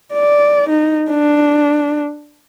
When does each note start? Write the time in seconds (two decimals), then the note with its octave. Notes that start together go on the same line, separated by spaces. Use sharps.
0.13 D5
0.69 D#4
1.10 D4